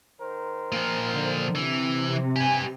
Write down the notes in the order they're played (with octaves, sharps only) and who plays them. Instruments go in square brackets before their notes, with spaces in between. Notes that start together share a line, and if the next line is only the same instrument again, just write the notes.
[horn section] D#3 A#4 C5
[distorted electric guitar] A#2 F3
[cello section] D3
[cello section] C3 [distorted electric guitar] E3
[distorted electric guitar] G4 B4 [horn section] G#5